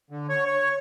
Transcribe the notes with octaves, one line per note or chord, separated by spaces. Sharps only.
D3
C#5
C#5